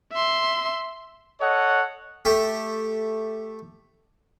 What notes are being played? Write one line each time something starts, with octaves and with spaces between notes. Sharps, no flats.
E5 C6
A4 C#5 D#5 F#5
A3 G4